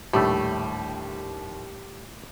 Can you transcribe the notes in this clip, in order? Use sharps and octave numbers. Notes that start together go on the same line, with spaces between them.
A#1 D#2 A2 G3 A3